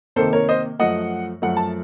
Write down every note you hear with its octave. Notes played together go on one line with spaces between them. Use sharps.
C3 D#3 A#3 A4 C5
A#4 C#5
C5 D#5
F#2 F3 A3 D#5 F#5
F#2 F3 A3 F#5
A5